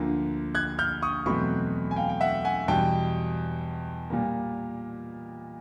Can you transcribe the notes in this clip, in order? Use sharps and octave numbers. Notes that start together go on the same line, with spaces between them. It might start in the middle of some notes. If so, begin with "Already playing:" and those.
Already playing: D2 D3 F3 A#3
F#6 G#6
F6 G6
C#6 D#6
E2 B2 F#3 A3 C4 B5 C#6
G#5
F5 G5
G5
E5 F#5
F#5 G#5
E2 B2 G3 G5 A5
A#2 G3 A#3